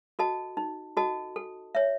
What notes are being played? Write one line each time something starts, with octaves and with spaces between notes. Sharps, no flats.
F#4 A4 D#5 A5
D#4
F#4 A4 D#5 A5
A4
C#5 E5